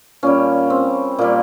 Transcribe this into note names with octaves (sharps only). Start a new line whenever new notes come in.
A#2 G3 C#4
C4
A#2 G3 A#3